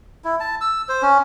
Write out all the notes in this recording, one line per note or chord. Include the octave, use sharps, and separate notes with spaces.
E4
A5
E6
C5
C#4